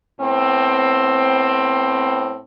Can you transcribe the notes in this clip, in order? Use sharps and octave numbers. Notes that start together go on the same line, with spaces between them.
A2 B3 C4